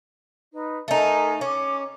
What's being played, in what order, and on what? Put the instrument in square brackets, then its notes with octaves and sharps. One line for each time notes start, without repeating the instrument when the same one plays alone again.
[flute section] D#4 B4
[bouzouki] A3 D#4 [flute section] A4 A#4 G#5
[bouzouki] C#4 [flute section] D6